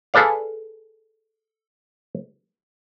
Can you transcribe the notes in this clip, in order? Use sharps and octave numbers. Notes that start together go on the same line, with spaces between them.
G#4 A4 B4 D5 F5